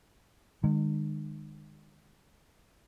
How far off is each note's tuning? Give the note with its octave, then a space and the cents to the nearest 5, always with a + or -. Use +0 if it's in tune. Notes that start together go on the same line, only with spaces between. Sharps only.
D#3 -45 G#3 -25